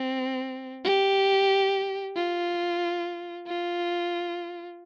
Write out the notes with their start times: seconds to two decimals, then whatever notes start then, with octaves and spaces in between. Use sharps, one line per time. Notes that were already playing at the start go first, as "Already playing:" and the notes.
Already playing: C4
0.85 G4
2.16 F4
3.47 F4